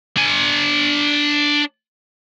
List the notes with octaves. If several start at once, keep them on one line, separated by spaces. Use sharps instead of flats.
D4 G#5